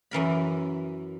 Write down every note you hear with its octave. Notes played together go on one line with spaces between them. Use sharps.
F#2 E3 A#4 B5